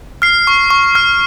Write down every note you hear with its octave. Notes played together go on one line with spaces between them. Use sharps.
F6 C7
C#6
C#6
F6